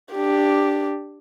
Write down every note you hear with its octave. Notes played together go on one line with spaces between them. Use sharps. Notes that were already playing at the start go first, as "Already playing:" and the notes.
D4 G4